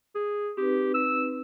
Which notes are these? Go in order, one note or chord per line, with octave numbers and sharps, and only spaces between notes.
G#4
C4 D#4 G4 B4
E6